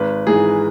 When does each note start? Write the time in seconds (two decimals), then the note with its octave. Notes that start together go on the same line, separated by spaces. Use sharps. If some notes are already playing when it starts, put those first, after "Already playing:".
Already playing: G#1 B4
0.27 G#2 E3 G#4